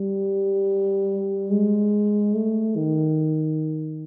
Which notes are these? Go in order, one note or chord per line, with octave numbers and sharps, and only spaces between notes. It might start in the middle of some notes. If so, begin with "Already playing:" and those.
Already playing: G3
G#3
A3
D#3